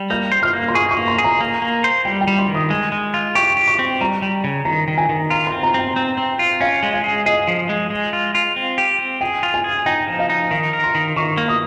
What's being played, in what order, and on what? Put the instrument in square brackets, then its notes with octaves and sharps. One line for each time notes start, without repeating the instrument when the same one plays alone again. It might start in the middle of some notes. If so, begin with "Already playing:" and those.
Already playing: [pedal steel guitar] G3
[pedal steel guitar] A#3 [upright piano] G6
[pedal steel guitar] C5
[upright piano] F6
[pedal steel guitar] A#3
[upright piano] C6
[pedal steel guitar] G#4 [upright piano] C#6
[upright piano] C#6
[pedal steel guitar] A#3
[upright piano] C6
[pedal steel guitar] G#4
[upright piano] A#5
[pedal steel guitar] A#3
A#3
C5
[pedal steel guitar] G3 [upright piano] G5
[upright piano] G5
[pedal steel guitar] G3
[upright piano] C6
[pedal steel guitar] D#3
[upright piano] D#6
[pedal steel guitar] G#3
G#3
F4
[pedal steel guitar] G4 [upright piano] C#6
[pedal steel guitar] G4
[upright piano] C#6
[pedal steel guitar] C4
[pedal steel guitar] G3 [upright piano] A#5
[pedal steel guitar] G3
C#3
[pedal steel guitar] D#3 [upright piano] A#5
[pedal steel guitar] D#3
[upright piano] G#5
[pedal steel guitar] D#3
[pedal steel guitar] F4 [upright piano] A#5
[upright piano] C6
[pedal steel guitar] C4
[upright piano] A#5
[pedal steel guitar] C4 [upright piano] G5
[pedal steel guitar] C4
C4
F4
[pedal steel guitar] C#4 [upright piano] F5
[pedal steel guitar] G#3
[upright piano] F5
[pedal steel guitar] G#4
[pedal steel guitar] G#4 [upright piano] D#5
[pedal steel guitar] F3
G#3
G#3
F4
F4
C4
G4
C4
[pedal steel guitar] G#4 [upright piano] G5
[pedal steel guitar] F4
[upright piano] G#5
[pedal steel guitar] G#4
[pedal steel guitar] D#4 [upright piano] G5
[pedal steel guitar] F3
[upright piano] F5
[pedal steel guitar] D#4
[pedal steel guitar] D#3 [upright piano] F5
[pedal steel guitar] A#4
[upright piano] C6
[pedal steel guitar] D#3
[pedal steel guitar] D#3 [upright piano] C#6
[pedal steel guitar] A#3
[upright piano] D#6